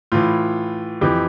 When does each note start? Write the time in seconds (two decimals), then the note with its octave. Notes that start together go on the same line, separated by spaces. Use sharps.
0.12 A2 E3 F4
1.01 F2 E3 G4